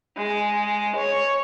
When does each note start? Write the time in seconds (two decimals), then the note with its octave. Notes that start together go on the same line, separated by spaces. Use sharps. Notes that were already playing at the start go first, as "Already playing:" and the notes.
0.16 G#3
0.96 C#5